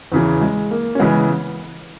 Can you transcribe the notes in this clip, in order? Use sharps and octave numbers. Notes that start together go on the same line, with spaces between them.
E2 C#3 E3
G#3
A#3
C#4
C#3 E3 G#3 B3